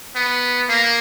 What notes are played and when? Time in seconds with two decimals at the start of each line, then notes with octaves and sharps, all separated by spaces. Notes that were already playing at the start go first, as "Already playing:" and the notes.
0.16 B3
0.69 A#3